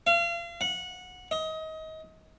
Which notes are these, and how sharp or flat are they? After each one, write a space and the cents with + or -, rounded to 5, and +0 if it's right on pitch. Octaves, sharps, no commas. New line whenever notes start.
F5 -35
F#5 -20
D#5 +25